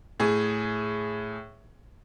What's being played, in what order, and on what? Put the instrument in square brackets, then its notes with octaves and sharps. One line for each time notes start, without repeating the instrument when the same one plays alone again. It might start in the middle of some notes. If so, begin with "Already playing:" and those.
[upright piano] A2 G#4